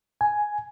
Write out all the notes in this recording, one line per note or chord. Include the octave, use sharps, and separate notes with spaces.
G#5